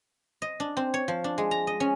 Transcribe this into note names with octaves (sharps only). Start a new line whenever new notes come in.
D#5
D4
C4
C#5
F3
D4
G#3
A#5
D#5
C#4